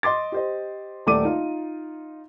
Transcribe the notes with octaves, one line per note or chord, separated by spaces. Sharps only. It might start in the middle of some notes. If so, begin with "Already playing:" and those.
D#5 C6 D6 A6
G4 C5 D#5
D#1 A3 D5 D6 D#7
D#4 F4